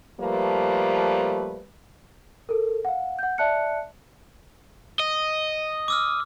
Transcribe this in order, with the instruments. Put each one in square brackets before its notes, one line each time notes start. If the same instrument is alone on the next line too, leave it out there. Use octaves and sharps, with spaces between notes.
[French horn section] F3 G3 A3 A#3 B4
[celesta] A4 A#4
F5 F#5
F#5 G6
D5 E5 A5 F#6 C#7
[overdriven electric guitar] D#5
[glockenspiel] D6 E6 F6